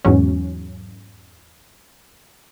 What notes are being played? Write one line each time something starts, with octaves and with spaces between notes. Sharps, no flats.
E2 G#2 F#3 C#4